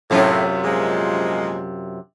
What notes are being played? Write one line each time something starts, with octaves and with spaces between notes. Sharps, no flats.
F#2 A2 C3 F4
A#2 F3 G#3